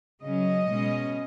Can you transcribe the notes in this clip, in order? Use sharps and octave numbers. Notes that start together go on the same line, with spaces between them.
C#3 F#3 C#4 D#5
B2 G#3 C#4